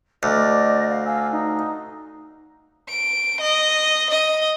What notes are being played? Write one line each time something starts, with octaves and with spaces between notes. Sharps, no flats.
D2 D5 D#5 D6
F5
F5 G#5 E6
D#4
D7
D#5
D#5